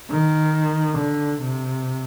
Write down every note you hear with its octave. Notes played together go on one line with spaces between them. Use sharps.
D#3
D3
C3